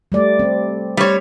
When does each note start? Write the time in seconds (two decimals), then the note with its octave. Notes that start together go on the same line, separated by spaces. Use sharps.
0.12 G3 A3 D5
0.39 C4
0.97 G3 C#5